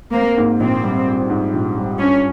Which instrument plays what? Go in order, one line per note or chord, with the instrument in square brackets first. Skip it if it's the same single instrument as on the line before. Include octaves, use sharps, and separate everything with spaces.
[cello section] A#3 [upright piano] C4
[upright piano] G#2
[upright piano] A#1 [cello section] C4
[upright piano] G3
C4
G#2
A#1
G3
[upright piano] G2 [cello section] C#4